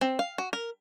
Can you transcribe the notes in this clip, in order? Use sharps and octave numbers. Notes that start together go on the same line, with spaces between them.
C4
F5
F#4
A#4